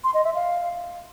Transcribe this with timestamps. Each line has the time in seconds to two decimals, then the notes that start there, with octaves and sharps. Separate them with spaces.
0.04 C6
0.14 D#5
0.24 E5
0.34 F5